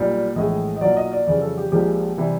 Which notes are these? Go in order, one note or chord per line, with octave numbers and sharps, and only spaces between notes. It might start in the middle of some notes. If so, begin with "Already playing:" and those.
Already playing: B1 A#2 G3
A#1 A2 E3 G#3 D#5
D#5
B1 A#2 F#3 D5
D#5
D5
F2 C#3 E3 G3 D5
A4
G4
A#1 A#2 F3 G#3 G4
C3 E3 G3